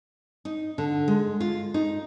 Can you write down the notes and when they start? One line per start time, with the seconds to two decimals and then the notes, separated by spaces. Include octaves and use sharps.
0.45 D#4
0.78 D3
1.08 G#3
1.40 F4
1.74 D#4